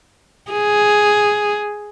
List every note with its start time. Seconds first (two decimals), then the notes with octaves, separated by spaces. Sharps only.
0.51 G#4